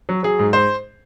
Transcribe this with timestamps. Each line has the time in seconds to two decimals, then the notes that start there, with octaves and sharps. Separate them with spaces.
0.09 F#3
0.23 F#3 G#4
0.39 G#2
0.53 C5